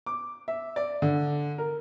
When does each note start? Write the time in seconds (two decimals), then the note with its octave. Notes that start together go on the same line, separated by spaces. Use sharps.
0.06 D6
0.48 E5
0.76 D5
1.02 D3
1.58 A#4